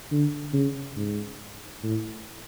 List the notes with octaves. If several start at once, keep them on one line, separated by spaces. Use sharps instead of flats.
D3
C#3
G#2
A2